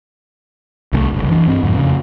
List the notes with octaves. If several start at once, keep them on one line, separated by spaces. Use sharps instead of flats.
C2 E3 A3
F#1 C2
E3 D4
G2 C4
F2 G#2 D3
F2 C#3